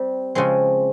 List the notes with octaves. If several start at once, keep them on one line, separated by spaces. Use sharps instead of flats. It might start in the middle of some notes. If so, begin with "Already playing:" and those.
Already playing: G3 C4
C#3 F3 G#3 C4